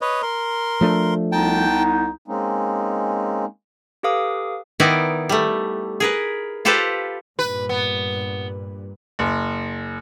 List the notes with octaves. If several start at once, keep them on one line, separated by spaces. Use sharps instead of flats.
B4 C#5 D#5
A#4 C6
F3 A3 D4
C2 B3 D#4 G5 A5
G#3 A#3 C4 C#4 D#4
G4 A4 B4 F5 D6 D#6
D#3 B3 D#4 E4 A#4 D5
G3 A3
G#4 A#4 B4
F4 G4 A4 B4 C5 F5
G2 A#2 B4
B3
F#1